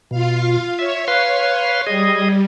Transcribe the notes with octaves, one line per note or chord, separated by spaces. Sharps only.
B2 F4 F5
C#5 E5
B4 F5 C6
G3 G#4 D#5